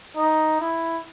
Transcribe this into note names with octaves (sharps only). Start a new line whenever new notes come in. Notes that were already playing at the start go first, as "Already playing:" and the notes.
D#4
E4